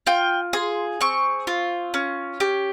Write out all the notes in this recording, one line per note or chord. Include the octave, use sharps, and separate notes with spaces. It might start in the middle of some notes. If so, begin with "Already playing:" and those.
F4 G5
G#4 C6
C4 C#6
F4
C#4
G4